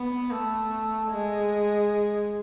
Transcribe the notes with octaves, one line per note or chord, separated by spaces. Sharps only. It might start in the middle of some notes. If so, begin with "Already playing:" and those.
Already playing: B3
A3
G#3